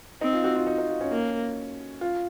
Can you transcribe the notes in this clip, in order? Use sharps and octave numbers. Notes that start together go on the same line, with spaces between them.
C4 D#4
F4
F#4
F4
D#4
D#4
F4
C#4
A#3
F4